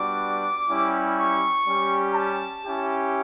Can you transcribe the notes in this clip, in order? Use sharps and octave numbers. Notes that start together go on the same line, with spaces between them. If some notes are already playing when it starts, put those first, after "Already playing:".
Already playing: G3 B3 D4 F#4 D6
G3 C#4 E4 G4
C#6
G3 C#4 G4
A5
C#4 E4 G4